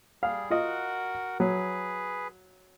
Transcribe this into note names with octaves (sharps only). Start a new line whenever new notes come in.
G3 G#4 F5
F4 F#4 A#4 D#5 F#5
F#3 G#4 B4